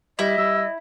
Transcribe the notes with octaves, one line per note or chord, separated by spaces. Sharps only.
G3 E4 D#5
G3 E6